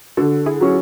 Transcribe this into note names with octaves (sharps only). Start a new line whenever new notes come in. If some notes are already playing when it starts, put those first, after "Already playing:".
D3 F#4 A4
E4 G#4
F#3 C#4